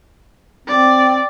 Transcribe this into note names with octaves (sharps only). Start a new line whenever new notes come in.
C4 D5